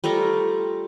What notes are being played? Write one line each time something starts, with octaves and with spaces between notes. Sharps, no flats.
G3 A3 F4 A#4